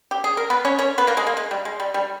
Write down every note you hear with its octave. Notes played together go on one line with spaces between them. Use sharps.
G4
G#4
A#4
B3 B4
C#4 C#5
C#4 C#5
B3 B4
A#3 A#4
G#3 G#4
A#3
G#3
G3
G#3
G3
G3